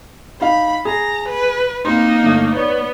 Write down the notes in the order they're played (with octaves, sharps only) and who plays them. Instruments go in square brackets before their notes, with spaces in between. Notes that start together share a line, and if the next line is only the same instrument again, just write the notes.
[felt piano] D#4 F5 [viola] B5
[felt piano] G#4 [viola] A#5
[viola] B4
[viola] A#3 D#4 [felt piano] C4 C6
[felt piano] G1 A3
[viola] B3 [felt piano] C#5 D5